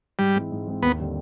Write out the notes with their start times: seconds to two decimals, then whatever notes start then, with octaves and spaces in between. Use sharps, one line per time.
0.19 G#2 G3
0.36 E3 G#3 C4 E4
0.52 G#2
0.67 E3 G#3 C4 E4
0.83 D#2 B3
0.99 D3 G3 C4